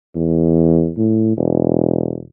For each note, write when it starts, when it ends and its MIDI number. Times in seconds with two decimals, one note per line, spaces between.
0.15 0.91 40
0.97 1.36 45
1.37 2.23 28